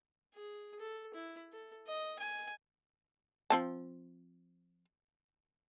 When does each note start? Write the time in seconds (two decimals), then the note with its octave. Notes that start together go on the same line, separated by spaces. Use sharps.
0.34 G#4
0.79 A4
1.14 E4
1.52 A4
1.87 D#5
2.19 G#5
3.50 F3 C4 A5